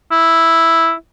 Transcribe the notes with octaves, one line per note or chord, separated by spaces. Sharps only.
E4